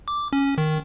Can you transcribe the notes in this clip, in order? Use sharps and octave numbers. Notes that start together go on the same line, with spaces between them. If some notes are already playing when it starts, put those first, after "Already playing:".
D6
C#4
D#3